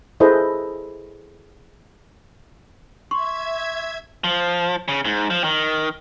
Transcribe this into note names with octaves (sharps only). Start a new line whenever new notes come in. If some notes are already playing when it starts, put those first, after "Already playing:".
E4 G#4 A4 B4 C5 D#5
E5 C6 C#6 G#6
F3
C#3
G#2
F3
D#3